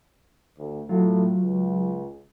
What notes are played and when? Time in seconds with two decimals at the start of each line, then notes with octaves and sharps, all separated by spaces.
0.58 D2
0.89 A2 F#3 F4
1.43 C#2